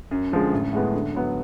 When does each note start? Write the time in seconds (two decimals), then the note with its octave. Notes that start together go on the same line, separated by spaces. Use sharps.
0.11 F#2
0.32 D3 F3 G#3
0.53 A1
0.72 A2 G#3 B3
0.94 D3
1.15 F#3 B3